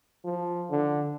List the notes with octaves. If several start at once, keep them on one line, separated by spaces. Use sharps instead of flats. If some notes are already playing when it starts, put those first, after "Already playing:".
F3
D3